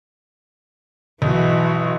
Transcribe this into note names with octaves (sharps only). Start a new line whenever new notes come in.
B1 E3 F#4